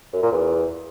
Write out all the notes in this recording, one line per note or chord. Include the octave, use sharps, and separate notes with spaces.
F#2
A#2
E2